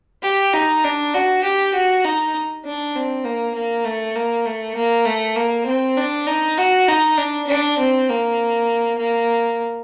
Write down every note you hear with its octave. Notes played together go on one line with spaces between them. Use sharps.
G4
D#4
D4
F#4
G4
F#4
D#4
D4
C4
A#3
A#3
A3
A#3
A3
A#3
A3
A#3
C4
D4
D#4
F#4
D#4
D4
D4
C4
A#3
A#3